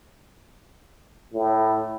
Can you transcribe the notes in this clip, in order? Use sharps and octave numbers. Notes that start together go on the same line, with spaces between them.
A2